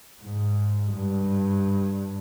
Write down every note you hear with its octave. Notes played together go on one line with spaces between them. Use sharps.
G#2
G2